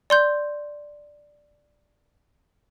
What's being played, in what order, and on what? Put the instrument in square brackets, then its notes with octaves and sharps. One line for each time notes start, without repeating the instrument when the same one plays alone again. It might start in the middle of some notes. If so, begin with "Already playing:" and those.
[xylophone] D5 C6 G6